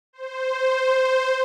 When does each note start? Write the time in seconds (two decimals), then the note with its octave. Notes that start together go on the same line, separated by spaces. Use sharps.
0.13 C5